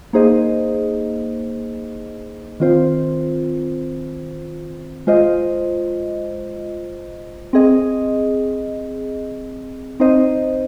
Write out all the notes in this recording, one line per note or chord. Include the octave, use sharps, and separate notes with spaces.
A#3 D#4 G#4 C5 D#5
D#3 C4 F4 C5
G#3 F4 C5 D#5
C4 G#4 D#5
C4 D#4 C5 D#5